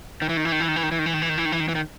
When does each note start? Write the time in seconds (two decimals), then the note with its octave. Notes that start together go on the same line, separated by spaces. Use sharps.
0.22 D#3
0.29 E3
0.37 D#3
0.45 E3
0.52 D#3
0.60 E3
0.68 D#3
0.76 E3
0.83 D#3
0.91 E3
0.99 D#3
1.06 E3
1.14 D#3
1.22 E3
1.29 D#3
1.38 E3
1.45 D#3
1.52 E3
1.60 D#3
1.68 E3
1.75 D#3